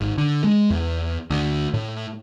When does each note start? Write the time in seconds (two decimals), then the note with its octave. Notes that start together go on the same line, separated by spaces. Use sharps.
0.01 G#1
0.18 D3
0.44 G#3
0.70 E2
1.30 D2
1.74 A2